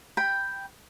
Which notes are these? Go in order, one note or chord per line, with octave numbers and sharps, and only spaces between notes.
G5 B5